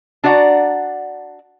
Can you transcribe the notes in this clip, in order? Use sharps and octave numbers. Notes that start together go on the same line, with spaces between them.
D4 F#4 D5 F5 F#5 A#5